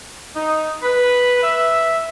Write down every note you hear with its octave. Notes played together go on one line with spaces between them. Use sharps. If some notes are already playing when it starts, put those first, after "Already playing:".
D#4
B4
E5